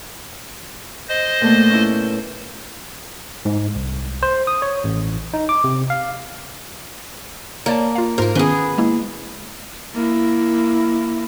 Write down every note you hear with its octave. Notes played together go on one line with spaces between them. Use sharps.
C5 D#5
A#2 A3 B3
C#4 E4
G#2
C2
C5
D#6
C#5
A1
D#4
D6
C3
F5
A#3 C#5 D5 A5
F4 F5
G#2 A#3 F4 A#4 C5
D#3 B3 C#4 G#4 B4
G#3 A#3 E4
A#3 E4